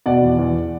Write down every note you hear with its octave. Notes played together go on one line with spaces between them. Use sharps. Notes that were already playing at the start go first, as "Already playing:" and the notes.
B2 D5 F#5
E2
E2